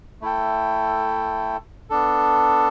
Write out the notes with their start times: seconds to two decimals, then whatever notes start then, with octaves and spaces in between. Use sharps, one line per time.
0.21 A3 E4 A4 G5
1.90 B3 D4 A4